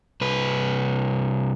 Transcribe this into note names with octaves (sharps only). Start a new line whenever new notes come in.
C2 B4